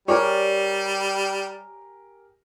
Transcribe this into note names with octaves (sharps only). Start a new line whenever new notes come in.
G3 G4 G#4 A#4 C#5 D5